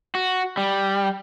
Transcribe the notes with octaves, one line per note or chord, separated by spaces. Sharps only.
F#4
G3